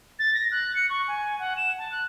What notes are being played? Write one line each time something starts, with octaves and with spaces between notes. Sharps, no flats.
A6
A#6
F#6
C#7
C#6
G#5
F#5
E7
A5
F#6